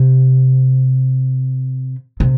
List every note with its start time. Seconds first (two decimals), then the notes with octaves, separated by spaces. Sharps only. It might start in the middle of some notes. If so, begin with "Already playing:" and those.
Already playing: C3
2.20 C3